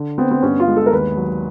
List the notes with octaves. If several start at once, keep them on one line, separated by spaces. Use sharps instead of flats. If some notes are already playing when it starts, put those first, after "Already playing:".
Already playing: D3
B3 C4
C4
G2 C#4
F4
G#3
A4
A#4
D#2 B4
F#3